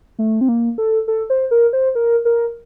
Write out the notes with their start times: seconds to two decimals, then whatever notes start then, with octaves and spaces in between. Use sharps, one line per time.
0.19 A3
0.41 C4
0.49 A#3
0.78 A4
1.08 A4
1.30 C5
1.51 A#4
1.73 C5
1.95 A#4
2.25 A#4